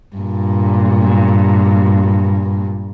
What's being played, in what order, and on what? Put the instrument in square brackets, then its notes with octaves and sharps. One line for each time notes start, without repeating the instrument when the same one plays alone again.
[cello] G2 A#2